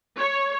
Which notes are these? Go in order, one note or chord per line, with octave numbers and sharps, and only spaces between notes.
C#5